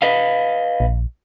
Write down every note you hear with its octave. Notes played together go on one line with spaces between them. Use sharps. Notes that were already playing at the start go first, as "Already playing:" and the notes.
B4 D#5 F5
A#1